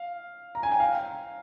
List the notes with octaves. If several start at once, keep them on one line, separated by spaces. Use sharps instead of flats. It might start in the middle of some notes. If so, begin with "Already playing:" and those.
Already playing: F5
A#5
G#5
G5
F5